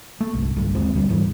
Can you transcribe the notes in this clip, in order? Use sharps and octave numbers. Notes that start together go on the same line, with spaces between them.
A3
G1 C2
B1 G2 D3
D#2 G#3 C4
F#1 D2 D3 G3
G#2 E3 G3